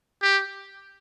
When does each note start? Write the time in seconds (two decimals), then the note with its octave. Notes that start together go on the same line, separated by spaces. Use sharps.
0.22 G4